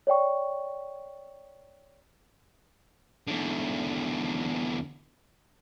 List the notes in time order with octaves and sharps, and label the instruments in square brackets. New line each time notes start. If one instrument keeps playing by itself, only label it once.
[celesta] C#5 D5 G5 C#6
[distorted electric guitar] E2 D3